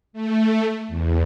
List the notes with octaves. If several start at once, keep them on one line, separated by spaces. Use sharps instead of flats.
A3
E2